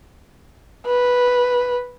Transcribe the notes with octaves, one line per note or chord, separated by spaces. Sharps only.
B4